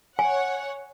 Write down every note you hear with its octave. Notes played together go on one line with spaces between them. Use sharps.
C#5 F#5 G#5